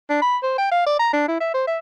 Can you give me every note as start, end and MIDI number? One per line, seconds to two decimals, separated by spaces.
0.10 0.21 62
0.22 0.37 83
0.43 0.56 72
0.58 0.72 79
0.72 0.82 77
0.86 0.96 74
0.99 1.09 82
1.13 1.26 62
1.28 1.40 64
1.40 1.53 76
1.54 1.65 72
1.67 1.78 76